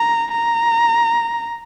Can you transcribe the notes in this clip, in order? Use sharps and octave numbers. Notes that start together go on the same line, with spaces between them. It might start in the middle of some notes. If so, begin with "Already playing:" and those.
Already playing: A#5
A#5